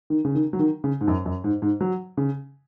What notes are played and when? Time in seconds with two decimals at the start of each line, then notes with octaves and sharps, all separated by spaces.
0.10 D#3
0.25 C#3
0.35 D#3
0.53 F#3
0.59 D#3
0.84 C#3
1.01 G#2
1.08 F#2
1.26 F#2
1.44 G#2
1.62 G#2
1.81 F#3
2.17 C#3